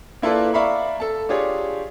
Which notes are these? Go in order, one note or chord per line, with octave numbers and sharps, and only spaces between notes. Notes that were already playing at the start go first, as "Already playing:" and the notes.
A#3 E4 F4 A4 B4 D5
D5 E5 F5 A#5 B5 C#6
A4 A5
D4 F4 G4 G#4 C#5